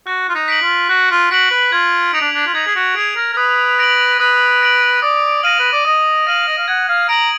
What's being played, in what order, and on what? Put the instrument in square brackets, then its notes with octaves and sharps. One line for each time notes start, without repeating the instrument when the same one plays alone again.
[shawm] F#4 [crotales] F#6
[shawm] F4
D#4
[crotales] B6 D7 F#7
[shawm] F4
[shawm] F#4 [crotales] F#6
[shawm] F4
[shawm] F#4 [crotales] B6 D7 F#7
[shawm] B4
[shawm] F4 [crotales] G#6
[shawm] D#4 [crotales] D7 F7
[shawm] D4
D4
F4
[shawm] D#4 [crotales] G#6
[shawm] G#4
F#4
[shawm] G#4 [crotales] D7 F7
[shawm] A#4
A#4
[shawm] B4 [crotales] D#6
[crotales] A#6 D7 F#7
[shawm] B4 [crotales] D#6
[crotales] A#6 D7 F#7
[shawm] D5 [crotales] D#6
[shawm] F5 [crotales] A#6 D#7 F#7
[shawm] B4
D5
[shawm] D#5 [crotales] D#6
[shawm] F5 [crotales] A#6 D#7 F#7
[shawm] D#5
F5
[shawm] F#5 [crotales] G#6
[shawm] F5
[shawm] A#5 [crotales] D7 F#7